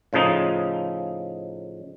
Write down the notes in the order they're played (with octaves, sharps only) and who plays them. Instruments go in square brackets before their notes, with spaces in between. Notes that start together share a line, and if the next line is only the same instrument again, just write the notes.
[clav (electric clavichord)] A2 C#3 F3 D#4